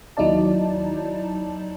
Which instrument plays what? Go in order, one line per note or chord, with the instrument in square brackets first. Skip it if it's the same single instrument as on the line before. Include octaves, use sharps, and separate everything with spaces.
[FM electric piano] D#2 F#3 D#4 E4 D5 A5